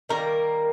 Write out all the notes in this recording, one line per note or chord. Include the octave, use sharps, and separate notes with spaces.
D#3 G3 A#3 A#4